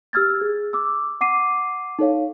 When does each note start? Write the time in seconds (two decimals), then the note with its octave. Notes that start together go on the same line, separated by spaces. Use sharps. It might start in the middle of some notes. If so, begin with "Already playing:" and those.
0.13 G4 E6 F6 G#6 A6
0.41 G#4
0.73 D6 E6
1.21 F#5 D6 C7 D#7
1.99 D#4 A4 C#5 F5